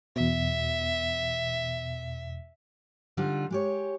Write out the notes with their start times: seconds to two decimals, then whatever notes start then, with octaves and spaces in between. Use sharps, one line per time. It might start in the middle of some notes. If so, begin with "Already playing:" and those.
0.16 E2 B2 E5
3.17 D3 G3 D#4 F4
3.50 G#3 G4 C#5